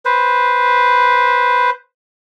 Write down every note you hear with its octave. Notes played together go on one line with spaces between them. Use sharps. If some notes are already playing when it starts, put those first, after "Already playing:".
B4 C5